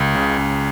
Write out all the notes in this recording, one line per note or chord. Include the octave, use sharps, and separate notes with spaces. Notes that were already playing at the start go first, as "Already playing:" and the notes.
Already playing: C#2
C#3
C#2